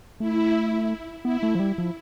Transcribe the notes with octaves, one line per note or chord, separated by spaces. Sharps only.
A3 E4
B3 E4
A3
F3
G3
F3